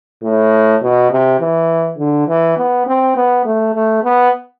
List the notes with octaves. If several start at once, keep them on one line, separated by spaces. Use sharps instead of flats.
A2
B2
C3
E3
D3
E3
B3
C4
B3
A3
A3
B3